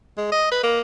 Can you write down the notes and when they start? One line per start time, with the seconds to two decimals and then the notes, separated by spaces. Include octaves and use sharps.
0.18 G#3
0.32 D#5
0.51 B4
0.63 A#3